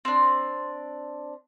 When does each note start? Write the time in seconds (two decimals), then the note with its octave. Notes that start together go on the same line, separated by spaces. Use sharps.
0.05 C4 D4